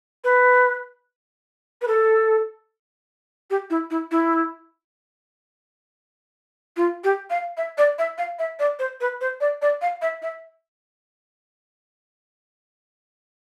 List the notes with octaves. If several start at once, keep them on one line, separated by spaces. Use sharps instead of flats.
B4
B4
A4
G4
E4
E4
E4
F4
G4
F5
E5
D5
E5
F5
E5
D5
C5
B4
C5
D5
D5
F5
E5
E5